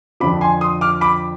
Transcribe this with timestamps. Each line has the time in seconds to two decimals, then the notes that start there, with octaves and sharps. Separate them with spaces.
0.20 F2 D3 F3 B5 D6
0.41 G#5 C6
0.61 C6 D#6
0.81 D6 F6
1.01 B5 D6